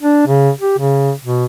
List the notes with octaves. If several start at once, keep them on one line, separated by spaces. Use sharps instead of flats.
D4
C#3
G4
C#3
B2